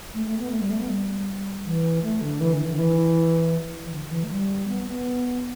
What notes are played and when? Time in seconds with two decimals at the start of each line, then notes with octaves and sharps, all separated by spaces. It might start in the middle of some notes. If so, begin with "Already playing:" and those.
0.13 A3
0.26 A3
0.39 B3
0.51 A3
0.60 G3
0.70 A3
0.79 B3
0.89 G3
1.65 E3
2.03 A3
2.21 D3
2.40 E3
2.53 D3
2.65 E3
2.72 D3
2.78 E3
3.85 E3
3.92 D3
4.11 E3
4.23 A3
4.30 G3
4.68 B3
4.87 B3